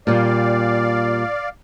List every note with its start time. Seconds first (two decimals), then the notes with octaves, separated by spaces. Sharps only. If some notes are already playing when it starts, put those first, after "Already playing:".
0.07 A#2 G3 D5 F5